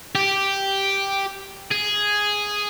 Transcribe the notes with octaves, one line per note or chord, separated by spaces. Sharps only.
G4
G#4